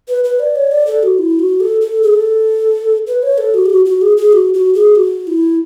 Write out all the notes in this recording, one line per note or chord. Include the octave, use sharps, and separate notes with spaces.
B4
B4
D5
C#5
D5
A4
F#4
E4
F#4
A4
A4
G#4
A4
B4
C#5
A4
F#4
G#4
F#4
F#4
G#4
G#4
F#4
F#4
G#4
F#4
E4